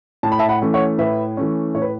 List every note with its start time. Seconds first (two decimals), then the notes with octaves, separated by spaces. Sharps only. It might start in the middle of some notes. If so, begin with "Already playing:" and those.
0.23 A2 A5
0.32 B5
0.39 E5 A5
0.49 F#5 B5
0.62 E3 A3 C#4
0.74 C#5 F#5
0.98 A2 B4 E5
1.37 E3 A3 C#4
1.75 A2 C#5
1.82 B4